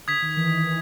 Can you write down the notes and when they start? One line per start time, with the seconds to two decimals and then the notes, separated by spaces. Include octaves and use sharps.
0.08 D3 D#6 G#6 B6
0.22 D#3
0.37 E3
0.52 E3